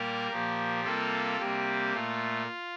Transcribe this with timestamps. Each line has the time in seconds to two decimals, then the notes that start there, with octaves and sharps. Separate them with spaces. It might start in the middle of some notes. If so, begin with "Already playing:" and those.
Already playing: A#2 G3 A#3 G4 A#4
0.31 A#2 F3 A#3 G4
0.84 C3 G3 A#3 F4 A4
1.40 C3 G3 A#3 G4
1.93 A#2 A3 F4